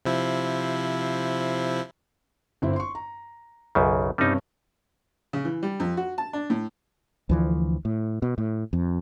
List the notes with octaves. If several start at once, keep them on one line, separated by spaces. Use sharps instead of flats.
C3 F3 E4
G1 C4 E4
C6 C#6
A#5
B1 F#2 C#3
G2 C3 G3 C#4 D#4
C#3
E3
G3
F2
F#4
A5
D4
A2
D2 E3 F3
A2
B2
A2
F2